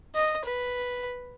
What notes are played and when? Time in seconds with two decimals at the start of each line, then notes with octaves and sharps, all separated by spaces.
0.15 D#5
0.45 B4